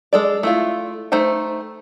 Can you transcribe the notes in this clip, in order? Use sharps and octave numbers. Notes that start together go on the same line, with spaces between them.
G#3 A4 D5
A3 E4 F4
A3 D#4 C5 G5